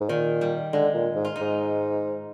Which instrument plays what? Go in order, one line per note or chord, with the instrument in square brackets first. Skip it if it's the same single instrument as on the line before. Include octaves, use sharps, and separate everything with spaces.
[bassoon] G#2
[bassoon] A#2 [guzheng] D#3
[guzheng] G3
[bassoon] D3 [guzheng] G#3
[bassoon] A#2
G#2
[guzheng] F4
D#4
[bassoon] G#2